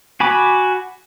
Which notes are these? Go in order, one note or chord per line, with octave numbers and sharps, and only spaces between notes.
F#4 G#5 B5 D6